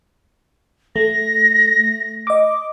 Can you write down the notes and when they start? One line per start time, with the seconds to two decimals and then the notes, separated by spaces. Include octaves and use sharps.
0.96 A3 A#6
2.27 D#5 D6